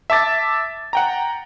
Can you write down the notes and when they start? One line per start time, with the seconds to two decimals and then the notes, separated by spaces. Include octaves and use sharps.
0.10 E5 A5 D6 A6
0.93 F#5 G5 A#5